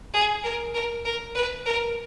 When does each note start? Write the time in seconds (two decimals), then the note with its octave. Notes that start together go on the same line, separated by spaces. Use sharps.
0.14 G#4
0.43 A#4
0.74 A#4
1.05 A#4
1.35 B4
1.66 A#4